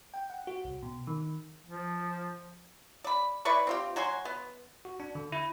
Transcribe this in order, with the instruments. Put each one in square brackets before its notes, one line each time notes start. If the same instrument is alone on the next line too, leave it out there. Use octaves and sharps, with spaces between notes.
[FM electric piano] G5
F#5
F#4
C2
B2
D#3
[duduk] F3
[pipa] D5 B5
E4 B4 D5 C#6
C4 F4 G4
F#3 F#4 G#5 C6
B3
[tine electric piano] F#4
D4
D3
E4